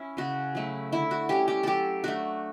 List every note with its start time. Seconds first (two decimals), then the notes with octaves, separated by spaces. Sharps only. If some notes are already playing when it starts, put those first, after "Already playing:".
Already playing: C#4 E4
0.17 C#3 F#4
0.55 F#3 A3 E4
0.92 D3 E4
1.11 F#4
1.29 G3 C#4 G4
1.48 G4
1.63 F#3 G4 A4
2.04 A3 D4 F#4